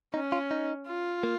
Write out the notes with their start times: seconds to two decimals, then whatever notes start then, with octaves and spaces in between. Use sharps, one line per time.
0.14 C#4 D#4
0.32 F4
0.51 D#4
0.88 F4
1.23 A#3